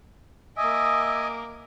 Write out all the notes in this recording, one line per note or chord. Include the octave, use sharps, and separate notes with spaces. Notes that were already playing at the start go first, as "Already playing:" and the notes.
A#3 D#5 E5 G#5 D6 D#6